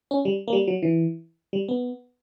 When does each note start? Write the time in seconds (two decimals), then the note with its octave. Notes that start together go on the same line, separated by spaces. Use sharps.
0.11 C#4
0.25 G3
0.48 A#3
0.53 G3
0.67 F#3
0.83 E3
1.53 G3
1.68 B3